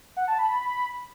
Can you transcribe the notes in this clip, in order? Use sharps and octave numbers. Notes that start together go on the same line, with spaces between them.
F#5
A5
B5
B5
B5